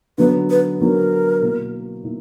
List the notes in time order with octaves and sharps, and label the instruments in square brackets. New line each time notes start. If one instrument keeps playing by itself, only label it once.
[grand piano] D3 F#3 B3 [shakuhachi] B4
[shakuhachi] B4
[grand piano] D3 F#3 B3 [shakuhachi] A#4
[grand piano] B2 A#3 E4
B2 A#3 E4